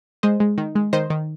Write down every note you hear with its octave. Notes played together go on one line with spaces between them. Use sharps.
G#3 C5 D#5
G#3
D#3
G#3
D#3 C5 D#5
D#3